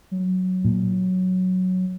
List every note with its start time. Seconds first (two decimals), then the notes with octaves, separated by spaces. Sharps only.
0.11 F#3
0.65 A#2